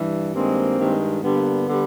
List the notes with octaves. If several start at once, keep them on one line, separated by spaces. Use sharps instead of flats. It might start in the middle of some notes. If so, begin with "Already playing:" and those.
Already playing: G2 E3 G3
G2 D#3 G#3 A#3 C4
G2 D#3 G#3
G2 D3 G3 A#3 B3
D3 G3